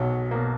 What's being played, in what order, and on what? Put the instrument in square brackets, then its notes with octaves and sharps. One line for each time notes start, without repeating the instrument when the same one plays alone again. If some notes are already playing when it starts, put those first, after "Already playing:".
Already playing: [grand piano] B1 B2 [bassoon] F#3
[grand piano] B2 A#3